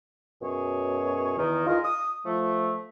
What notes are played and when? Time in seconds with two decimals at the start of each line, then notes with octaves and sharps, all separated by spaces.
0.42 F#2 B2 G#4 C#5
1.37 E2 D#3
1.67 D#4 F4 G#4 A#4
1.84 D#6
2.25 F3 A3